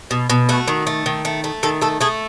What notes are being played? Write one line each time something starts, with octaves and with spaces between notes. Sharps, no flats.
B2
B2
A3 F#4
D#3
A3
D#3
A3
A3
D#3 A4
A3 A4
A3 G#4